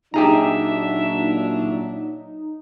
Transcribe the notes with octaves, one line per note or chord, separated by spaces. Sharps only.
A#2 F#3 D4 D#4 G4 G#4 E5 A#5